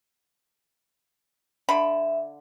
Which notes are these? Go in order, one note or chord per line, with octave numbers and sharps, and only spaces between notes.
D3 E5 B5